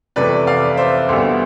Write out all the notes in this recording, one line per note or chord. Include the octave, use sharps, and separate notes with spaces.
F2 C3 E3 A3 B4 D5
D5 F5
C5 E5
D2 D3 G3 B3